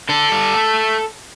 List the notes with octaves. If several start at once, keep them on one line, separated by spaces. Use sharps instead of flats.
D3 A4
G3
A3